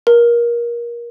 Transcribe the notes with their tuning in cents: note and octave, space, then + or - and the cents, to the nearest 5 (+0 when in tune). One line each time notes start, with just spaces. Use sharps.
A#4 +25